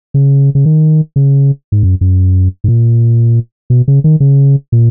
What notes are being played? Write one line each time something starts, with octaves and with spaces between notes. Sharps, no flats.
C#3
C#3
D#3
C#3
G#2
F#2
F#2
G#2
A#2
B2
C#3
D#3
C#3
A#2